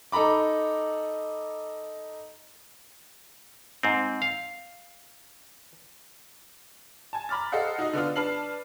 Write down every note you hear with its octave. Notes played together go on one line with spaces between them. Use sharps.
D#4 A4 A#5 B5 D6
G#2 C4
F5
G#5 A5
A#5 B5 D6 F6 A6
A4 C5 D#5 F5 F#5
D#4 F#4 D#5
D3 B3 D4 F4
D4 B4 A5 F6 C7 F#7